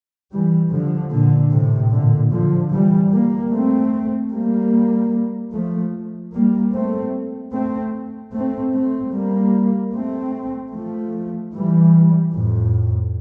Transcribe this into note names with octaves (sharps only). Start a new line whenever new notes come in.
E3 G3
D3 F3
A#2 D3
A2 C3
A#2 D3
D3 F3
E3 G3
G3 A#3
A3 C4
G3 A#3
F3 A3
G3 A#3
A3 C4
A3 C4
A3 C4
A3 C4
G3 A#3
A3 C4
F3 A3
E3 G3
F2 A2